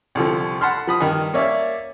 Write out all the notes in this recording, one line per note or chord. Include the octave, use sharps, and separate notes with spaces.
C2 D3 F3
F#5 A5 B5 C6 F6
F3 B5 D#6
G2 D#3 F6
A#3 C#4 C#5 D5 E5